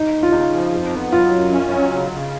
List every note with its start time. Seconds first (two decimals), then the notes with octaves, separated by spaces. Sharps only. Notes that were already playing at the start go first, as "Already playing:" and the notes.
Already playing: D#4
0.12 D#2
0.23 F4
0.32 C#3 D#4
0.52 F3
0.72 F2
0.92 B3
1.12 F#3 F4
1.31 F#2
1.51 C#4
1.71 F#3
1.90 C#3
2.11 C#3